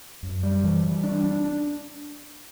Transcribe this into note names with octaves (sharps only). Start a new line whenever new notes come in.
F#2
G3
E3
G3
D4
D4
D4